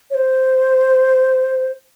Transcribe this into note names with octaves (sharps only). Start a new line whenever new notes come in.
C#5
C5